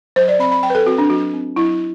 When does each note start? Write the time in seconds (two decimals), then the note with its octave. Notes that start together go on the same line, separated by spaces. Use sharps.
0.16 F#3 C5
0.28 D5
0.39 C4 B5
0.52 B5
0.63 F#3 G5
0.70 B4
0.75 A4
0.86 C4 F#4
0.98 D4
1.10 F#3 F#4
1.33 C4
1.56 F#3 E4